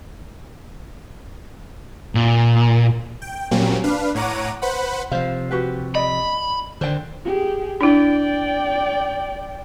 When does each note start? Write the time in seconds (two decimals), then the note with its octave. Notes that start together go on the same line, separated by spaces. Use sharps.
2.15 A#2
3.22 G5
3.51 A#2 F#3 G3 A#3 C4 C#4
3.84 D4 B4 F5
4.15 A2 C#5 F#5 A#5 D6 D#7
4.62 B4 C5 F#5 B5
5.11 C3 F3 C5 F5
5.51 F#4 G4 B4
5.95 D5 D#5 B5
6.81 D3 D#3 C5 D5 G5
7.25 G4 G#4
7.81 D4 E4 D5 G5